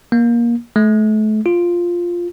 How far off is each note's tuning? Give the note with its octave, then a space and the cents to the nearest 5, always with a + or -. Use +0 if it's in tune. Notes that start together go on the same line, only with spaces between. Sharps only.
A#3 +20
A3 -35
F4 +0